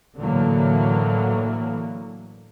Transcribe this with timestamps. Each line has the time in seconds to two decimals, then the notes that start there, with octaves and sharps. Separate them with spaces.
0.17 A2 D3 E3 F#3 A#3